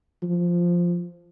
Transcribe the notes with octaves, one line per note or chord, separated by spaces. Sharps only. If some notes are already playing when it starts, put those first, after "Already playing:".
F3